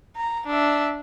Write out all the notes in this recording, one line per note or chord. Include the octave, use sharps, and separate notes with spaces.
A#5
D4 E5